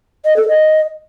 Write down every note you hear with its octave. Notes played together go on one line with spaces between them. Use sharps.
D#5
A4
D#5